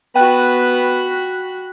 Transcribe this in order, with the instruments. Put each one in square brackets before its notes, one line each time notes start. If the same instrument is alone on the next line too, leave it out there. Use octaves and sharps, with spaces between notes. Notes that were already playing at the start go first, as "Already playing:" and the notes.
[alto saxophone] B3 [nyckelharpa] F#4 B5 [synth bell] G5 F#6